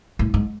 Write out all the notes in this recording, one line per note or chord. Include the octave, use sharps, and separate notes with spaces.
A2
G#2